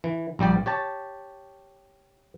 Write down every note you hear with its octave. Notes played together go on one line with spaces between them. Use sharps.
E3
A#1 G3 G4 D5
G4 C#5 A5